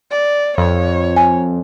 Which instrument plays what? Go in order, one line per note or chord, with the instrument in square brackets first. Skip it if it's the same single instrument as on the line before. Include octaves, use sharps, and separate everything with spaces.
[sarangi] D5
[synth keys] F2 [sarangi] C#5
[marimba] G#5